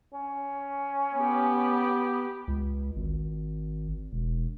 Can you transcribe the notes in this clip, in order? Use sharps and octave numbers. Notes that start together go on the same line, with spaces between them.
C#4
B3 G4
C#2
G#1
E1